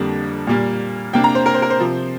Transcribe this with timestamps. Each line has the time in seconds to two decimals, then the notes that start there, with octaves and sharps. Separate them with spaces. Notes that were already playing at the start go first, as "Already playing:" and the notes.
Already playing: F2 D3 G3 A#3 D4
0.47 A#2 G3 A#3
1.13 C3 A#3 D4 G5
1.24 A#5
1.35 C5
1.46 A#4
1.54 C5
1.62 A#4
1.70 C5
1.79 C3 F3 C4